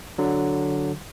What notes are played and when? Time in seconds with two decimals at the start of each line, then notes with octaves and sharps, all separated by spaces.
0.18 D3 F#3